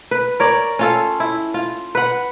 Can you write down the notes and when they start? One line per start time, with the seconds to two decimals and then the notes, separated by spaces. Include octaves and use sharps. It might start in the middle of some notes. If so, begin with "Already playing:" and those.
0.11 B4
0.40 A#4 C#5 D5
0.79 C#4 F4 A4
1.20 E4
1.54 F4
1.95 B4 F#5